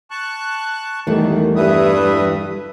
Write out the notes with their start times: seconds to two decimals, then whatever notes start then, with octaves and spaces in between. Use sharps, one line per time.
0.11 A5 C#6 F#6
1.07 E2 D#3 E3 G3 A3
1.56 G2 B4 E5 D#6